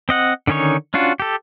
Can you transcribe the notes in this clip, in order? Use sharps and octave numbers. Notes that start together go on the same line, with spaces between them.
C4 D#5 F#5
D3 D#3 C#4 D#4 C#5
C#4 D4 F4 F#4
G4 A4